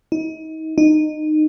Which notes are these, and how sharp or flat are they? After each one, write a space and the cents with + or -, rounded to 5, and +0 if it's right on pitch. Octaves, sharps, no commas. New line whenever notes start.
D#4 +35
D#4 -20